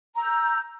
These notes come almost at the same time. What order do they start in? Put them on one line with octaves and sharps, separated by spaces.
A#5 E6 G6